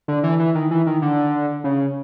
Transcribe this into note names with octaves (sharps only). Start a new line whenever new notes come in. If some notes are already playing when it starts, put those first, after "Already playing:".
D3
E3
E3
D#3
E3
D#3
D3
C#3